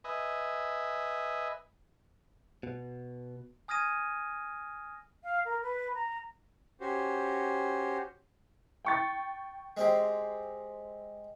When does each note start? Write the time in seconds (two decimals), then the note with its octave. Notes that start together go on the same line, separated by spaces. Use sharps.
0.04 B4 D#5 E5 G#5
2.63 B2
3.68 G#5 D#6 F6 G#6 A#6 D#7
5.23 F5
5.45 A#4
5.62 B4
5.94 A#5
6.81 C#4 F#4 G4 C5
8.85 G5 C#6 A6
9.77 G#3 C4 G4